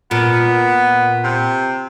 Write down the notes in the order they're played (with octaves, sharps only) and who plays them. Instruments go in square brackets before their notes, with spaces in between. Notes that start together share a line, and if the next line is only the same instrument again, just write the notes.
[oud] A#2 [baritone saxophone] B3
[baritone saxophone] C3